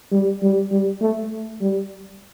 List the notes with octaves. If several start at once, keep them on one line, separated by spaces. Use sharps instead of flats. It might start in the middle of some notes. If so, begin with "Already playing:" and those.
G3
G3
G3
A3
G3